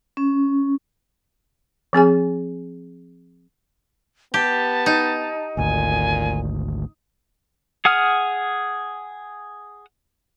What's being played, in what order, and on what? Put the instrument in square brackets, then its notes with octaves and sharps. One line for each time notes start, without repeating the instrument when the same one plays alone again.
[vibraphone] C#4
[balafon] F3 C4 G#4 G#5
[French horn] B3 [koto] G4 [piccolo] A5
[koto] D#4
[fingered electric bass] G#1 D2 [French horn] A#2 [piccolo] G#5
[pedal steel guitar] G#4 F#5 D#6 F6